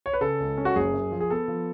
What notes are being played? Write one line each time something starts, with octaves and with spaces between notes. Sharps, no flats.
C#5
B4
C#3 A4
C#2
C#4
F#4
F#1 G#4
F#2
F3
G#4
B3 A4
F3